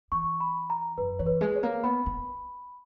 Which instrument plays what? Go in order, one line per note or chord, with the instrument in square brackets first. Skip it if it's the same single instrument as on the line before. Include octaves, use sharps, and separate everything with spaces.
[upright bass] E3 [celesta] C#6
[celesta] B5
A#5
[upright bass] F#2 [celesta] B4
[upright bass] E3 [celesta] C#5
[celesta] B4
[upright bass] G#3
[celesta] C#5
[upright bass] A#3
[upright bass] B3 [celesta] B5
[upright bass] B3